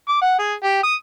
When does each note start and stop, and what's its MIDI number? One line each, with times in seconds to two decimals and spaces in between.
0.08 0.21 86
0.22 0.35 78
0.39 0.54 68
0.63 0.83 67
0.83 0.95 87